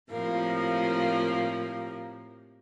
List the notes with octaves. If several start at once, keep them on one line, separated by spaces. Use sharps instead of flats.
A2 C3 F3 A#3